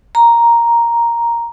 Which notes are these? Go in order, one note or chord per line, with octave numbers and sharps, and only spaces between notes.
A#5